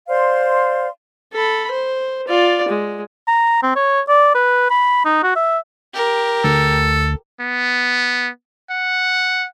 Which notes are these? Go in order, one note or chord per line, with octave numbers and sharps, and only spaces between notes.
C5 D5 F5 C6
A4 B5
C5
F4 D5
G#3
A#5
C4
C#5
D5
B4
B5
D#4
F#4
E5
G4 A#4
D2 A4
B3
F#5